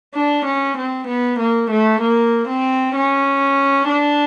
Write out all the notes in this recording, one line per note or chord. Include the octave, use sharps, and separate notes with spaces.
D4
C#4
C4
B3
A#3
A3
A#3
C4
C#4
D4